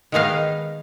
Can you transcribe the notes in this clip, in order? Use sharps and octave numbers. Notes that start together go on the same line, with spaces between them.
D#3 G#3 B3 D#4 F5